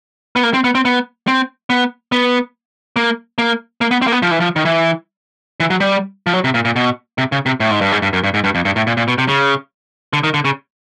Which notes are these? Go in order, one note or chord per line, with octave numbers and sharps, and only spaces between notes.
B3
A#3
C4
B3
C4
B3
C4
B3
B3
A#3
A#3
A#3
B3
C4
A#3
B3
F3
E3
F3
D#3
E3
E3
F#3
G3
F3
F#3
C3
A#2
A#2
B2
C3
C#3
C3
A2
G#2
G2
G#2
G2
F#2
G2
G#2
G2
F2
G2
A2
A#2
A#2
B2
C3
C#3
D3
D#3
D3
C#3